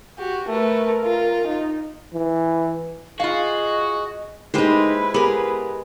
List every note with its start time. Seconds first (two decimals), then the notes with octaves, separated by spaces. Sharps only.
0.18 F#4 G4
0.48 A3 A#4 B4
1.04 F4
1.48 D#4
2.13 E3
3.20 F4 F#4 G#4 D#5 F5
4.54 G#3 A#3 D#4 E4 G4 B4 C5
5.14 B3 G4 G#4 A#4 B5